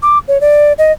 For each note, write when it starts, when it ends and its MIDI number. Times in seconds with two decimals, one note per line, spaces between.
0.03 0.19 86
0.28 0.41 73
0.41 0.73 74
0.78 0.92 75